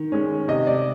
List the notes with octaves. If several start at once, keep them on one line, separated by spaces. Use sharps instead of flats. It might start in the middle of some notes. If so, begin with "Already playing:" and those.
Already playing: D#3
G#3 C#4
C3 D#5
D5